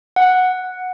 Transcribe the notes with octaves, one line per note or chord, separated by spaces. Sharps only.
F#5